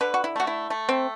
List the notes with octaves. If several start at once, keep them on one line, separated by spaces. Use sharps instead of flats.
D3 B4
F#4
E4
A3 F#4
E4
A3
C4